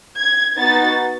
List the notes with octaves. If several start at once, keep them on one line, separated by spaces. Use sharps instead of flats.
G#6
B3 D#4 F#4 A6